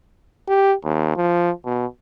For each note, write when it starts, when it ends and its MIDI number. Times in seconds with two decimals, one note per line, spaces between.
0.48 0.74 67
0.84 1.12 39
1.16 1.51 53
1.65 1.86 47